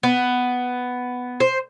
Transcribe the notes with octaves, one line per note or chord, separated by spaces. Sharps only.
B3
C5